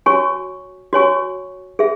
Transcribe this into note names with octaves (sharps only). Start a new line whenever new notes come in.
F#4 C#5 G#5 C#6
F#4 C#5 G#5 C#6
G#4 E5